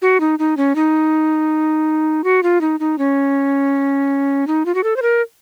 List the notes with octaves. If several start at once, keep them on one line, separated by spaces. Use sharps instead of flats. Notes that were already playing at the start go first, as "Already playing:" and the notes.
F#4
D#4
D#4
C#4
D#4
F#4
F4
D#4
D#4
C#4
D#4
F4
F#4
A4
C5
A#4